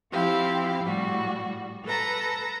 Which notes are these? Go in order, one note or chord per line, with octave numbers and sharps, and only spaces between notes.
F3 C4 E4 G4 F5
A2 G3 F#4
A4 B4 A5 A#5